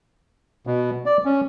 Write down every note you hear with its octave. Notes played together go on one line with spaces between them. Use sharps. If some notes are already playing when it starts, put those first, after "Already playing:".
B2
D5
C#4